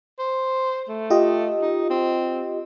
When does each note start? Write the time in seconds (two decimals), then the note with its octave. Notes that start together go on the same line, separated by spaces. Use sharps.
0.19 C5
0.88 A3
1.10 F4 G4 D#5
1.62 D#4
1.90 C4